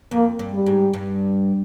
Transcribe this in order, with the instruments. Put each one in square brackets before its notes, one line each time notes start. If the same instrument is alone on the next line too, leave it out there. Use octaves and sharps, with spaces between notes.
[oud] F2 [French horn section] A#3
[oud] G2
[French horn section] G3
[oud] G#2
G2